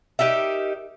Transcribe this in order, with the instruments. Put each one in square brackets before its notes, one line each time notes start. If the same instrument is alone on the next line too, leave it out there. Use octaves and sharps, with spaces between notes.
[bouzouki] D#4 G4 A#4 E5